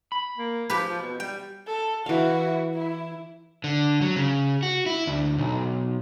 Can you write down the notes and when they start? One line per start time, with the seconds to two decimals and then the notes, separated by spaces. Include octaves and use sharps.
0.12 B5
0.38 A#3
0.70 F3 G4 B4
0.90 F3
1.02 B2
1.20 G3 G5
1.66 A4
2.06 E3 E4 F#4 F5
2.75 E4
3.64 D3
4.01 F#3
4.16 C#3
4.63 F#4
4.86 E4
5.07 D2
5.38 B1